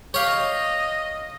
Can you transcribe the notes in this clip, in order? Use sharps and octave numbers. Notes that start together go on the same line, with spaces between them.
G4 C#5 F5
D#5